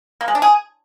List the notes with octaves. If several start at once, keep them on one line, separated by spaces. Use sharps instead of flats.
A#3
G#3
D4
G#4